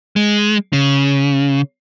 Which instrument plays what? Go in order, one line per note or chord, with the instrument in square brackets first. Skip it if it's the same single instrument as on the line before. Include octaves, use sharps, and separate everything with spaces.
[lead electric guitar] G#3
C#3